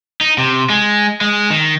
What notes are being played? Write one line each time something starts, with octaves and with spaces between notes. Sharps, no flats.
D#4
C3
G#3
G#3
D#3